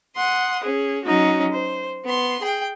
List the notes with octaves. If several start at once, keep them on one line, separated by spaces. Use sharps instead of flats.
F#5 C6 D#6
C#4 G#4
F#3 C#4 D#4 F#4
C5
B3 C6
G#4 G5